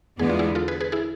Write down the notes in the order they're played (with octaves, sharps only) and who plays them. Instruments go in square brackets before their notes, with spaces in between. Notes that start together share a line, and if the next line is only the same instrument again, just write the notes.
[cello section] E2 D3 G#3 B3 [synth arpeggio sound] G#4
[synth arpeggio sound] F4
E4 G#4
F4 A4
G#4 B4
G#4 B4
E4 G#4